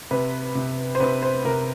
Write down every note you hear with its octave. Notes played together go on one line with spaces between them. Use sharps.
C3 B4
C3
C5
C3 B4
C5
C3 A#4